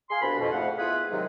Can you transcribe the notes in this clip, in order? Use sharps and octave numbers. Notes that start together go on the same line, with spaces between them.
G#4 F5 G#5 C6
C2 B2 C4 D4 F#4 B5
F2 B2
F2 G#2 A3 F5 F#5
B3 E4 F4 G#4 B4
G#2 C3 D#3 F#3 G#3